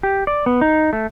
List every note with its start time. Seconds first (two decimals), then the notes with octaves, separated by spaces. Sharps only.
0.03 G4
0.27 D5
0.46 B3
0.61 D#4
0.93 A3